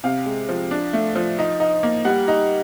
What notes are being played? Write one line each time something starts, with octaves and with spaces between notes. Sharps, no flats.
C3 F5
G#3
F3
D4
A3
F3
D#4
D#4
A#3
G3 F#5
D#4